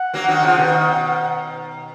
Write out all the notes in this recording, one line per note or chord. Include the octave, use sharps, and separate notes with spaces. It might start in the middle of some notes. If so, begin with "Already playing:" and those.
Already playing: F#5
F#3 A#3
D#3 F#3
C#3 F3
B2 D#3